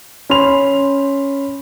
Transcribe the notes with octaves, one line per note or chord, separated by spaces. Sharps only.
C#4 B5 C6 F7